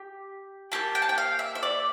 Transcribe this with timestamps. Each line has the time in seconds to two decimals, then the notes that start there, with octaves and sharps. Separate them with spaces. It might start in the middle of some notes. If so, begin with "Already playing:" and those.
Already playing: G4
0.72 A#3 E4 G4 A5
0.95 G5
1.02 A5
1.09 G5
1.18 F5
1.39 E5
1.55 E5
1.63 D5